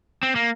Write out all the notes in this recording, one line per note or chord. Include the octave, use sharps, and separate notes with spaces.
C4
A#3